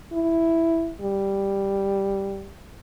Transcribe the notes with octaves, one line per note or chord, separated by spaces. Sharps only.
E4
G3